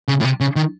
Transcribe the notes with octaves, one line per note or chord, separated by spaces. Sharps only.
C#3
A2
C3
C#3
D#3